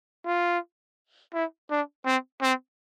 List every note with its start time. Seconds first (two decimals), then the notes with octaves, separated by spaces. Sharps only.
0.26 F4
1.33 E4
1.70 D4
2.05 C4
2.42 C4